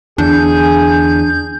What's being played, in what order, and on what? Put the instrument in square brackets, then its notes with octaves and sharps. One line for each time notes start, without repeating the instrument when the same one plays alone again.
[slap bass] E2 D3 [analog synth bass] D4 [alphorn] G#4 [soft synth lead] G6